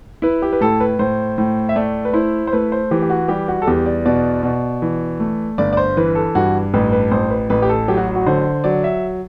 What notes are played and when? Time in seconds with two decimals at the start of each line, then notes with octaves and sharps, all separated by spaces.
0.22 E4 B4
0.42 G4
0.53 B4
0.61 A2 A4
0.80 B4
0.99 A2 C5
1.38 A2
1.69 E5
1.76 A3 D5
2.05 B4
2.13 E4 C5
2.47 C5
2.53 A3 B4
2.72 C5
2.91 E3 G4
3.02 G4
3.10 F#4
3.28 G3 G4
3.48 F#4
3.62 A4
3.67 E2 G4
3.86 D5
4.06 B2 D5
4.43 B2
4.82 E3
5.20 A3
5.58 G1 D5
5.73 D5
5.77 C5
5.97 E3 B4
6.15 A4
6.35 G2 F#4
6.74 A1 B4
6.92 B4
7.11 A1 C5
7.30 B4
7.50 A1 B4
7.62 G4
7.69 A4
7.88 F#3 G4
7.97 F#4
8.16 F#4
8.27 D3 C5
8.64 F#3 D5
8.84 E5